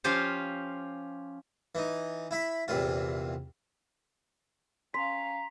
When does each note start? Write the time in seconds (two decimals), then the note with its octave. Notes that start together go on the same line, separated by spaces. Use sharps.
0.04 F3 C#4 F4 G4 C5 F5
1.75 E3 D#4
2.31 E4 E5 B5
2.68 A#1 E2 C3 F4
4.94 C#4 F5 A#5 C6 B6